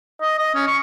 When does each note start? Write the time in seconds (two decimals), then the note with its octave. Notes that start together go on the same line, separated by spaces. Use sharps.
0.21 D#5
0.39 D#5
0.55 C#4
0.67 C#6